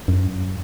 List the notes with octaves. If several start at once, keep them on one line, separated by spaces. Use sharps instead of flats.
F#2